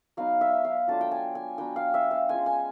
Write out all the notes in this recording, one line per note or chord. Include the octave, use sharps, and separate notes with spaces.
F#3 B3 D#4 F5
E5
F5
F#3 A3 D4 F4 A5
G5
G#5
G#5
F#3 B3 D4 G5
F5
E5
F5
G#3 C#4 F4 G#5
G#5